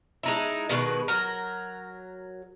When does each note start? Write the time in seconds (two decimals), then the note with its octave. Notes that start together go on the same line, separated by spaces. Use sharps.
0.23 G#3 D#4 E4
0.69 B2 D#3 G#3 B4
1.08 F#3 A#4